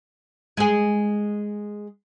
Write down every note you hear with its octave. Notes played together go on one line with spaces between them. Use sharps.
G#3 G#4